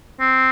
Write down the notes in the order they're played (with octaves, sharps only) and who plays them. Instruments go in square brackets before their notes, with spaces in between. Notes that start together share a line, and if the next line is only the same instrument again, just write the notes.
[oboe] C4